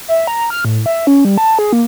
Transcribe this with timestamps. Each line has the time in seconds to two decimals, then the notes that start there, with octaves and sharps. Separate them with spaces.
0.08 E5
0.27 A#5
0.50 F6
0.65 A2
0.86 E5
1.07 C#4
1.25 G3
1.38 A5
1.59 G#4
1.73 A#3